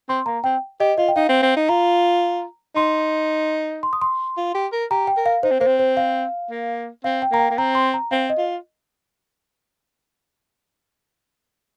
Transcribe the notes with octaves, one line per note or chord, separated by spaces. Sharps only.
C4 C6
A#3 A#5
C4 G5
G4 D#5
F4 D#5
G5
D#4 F5
C4
C4
D#4
F4 A#5
D#4 C6
C6
D#6
C6
F4
G4
A#4
G4 A#5
G5
A#4
F5
D#4 C5
C4
A#3 C5
C4
C5
F5
A#3
C4 F5
G5
A#3 A#5
G5
A#3
C4 A#5
C6
A#5
C4 F5
D#5
F4